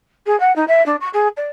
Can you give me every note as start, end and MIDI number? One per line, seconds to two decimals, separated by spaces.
0.26 0.38 68
0.40 0.54 78
0.55 0.65 63
0.68 0.84 76
0.86 0.96 62
1.00 1.09 85
1.13 1.28 68
1.37 1.50 74